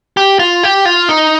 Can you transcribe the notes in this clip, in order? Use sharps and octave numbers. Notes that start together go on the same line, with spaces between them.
G4
F4
G4
F4
D#4